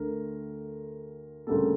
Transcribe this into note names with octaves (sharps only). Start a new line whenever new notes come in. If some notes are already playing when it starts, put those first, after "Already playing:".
Already playing: D2 D3 A3 A#4
D2 C#3 G3 A#3 A4